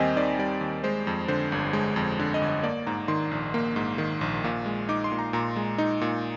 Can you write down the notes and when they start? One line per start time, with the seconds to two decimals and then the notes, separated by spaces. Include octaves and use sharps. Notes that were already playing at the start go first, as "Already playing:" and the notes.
Already playing: D#2 D#3 G3 C4 D#5 G5 G#5 C6
0.16 D#3 D5
0.39 G3 D5
0.61 D#2
0.84 G#3 C5
1.07 F2
1.28 D3 C5
1.52 G1
1.73 G#3
1.96 F2
2.19 D3
2.34 D#5
2.41 G1
2.48 D#5
2.63 A#3 D5
2.87 G#2 A#5
3.08 D#3 C6
3.31 A#1
3.54 A#3
3.76 G#2
3.98 D#3
4.21 A#1
4.44 A#2
4.66 G#3
4.89 D#4 D6
5.04 C6
5.12 A#2
5.19 A#5
5.33 A#2 A#5
5.56 G#3
5.78 D#4
6.01 A#2